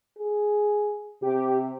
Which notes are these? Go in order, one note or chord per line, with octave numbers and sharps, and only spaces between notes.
G#4
C3 G4